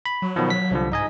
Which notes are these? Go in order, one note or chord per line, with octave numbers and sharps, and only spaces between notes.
B5
F#3
B2 D#3 F3
B6
C2 D3 F3
G#2 D#4 D#5 G#5